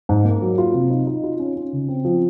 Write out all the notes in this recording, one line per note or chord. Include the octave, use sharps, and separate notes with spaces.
G#2
A#3
F#3
F4
C3
D#4
D#4
F4
C#4
C#4
C#3
C4
F3